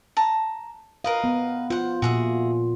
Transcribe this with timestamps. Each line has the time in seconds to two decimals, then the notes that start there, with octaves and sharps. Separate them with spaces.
0.17 A5 A#5
1.04 A#4 B4 D#5 F5
1.24 B3
1.70 F4 C5 F#5
2.02 A#2 F#4 G#4 E5